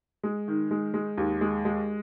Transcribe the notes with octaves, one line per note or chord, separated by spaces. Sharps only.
G#3
D#3
G#3
G#3
D#2
G#3
G#3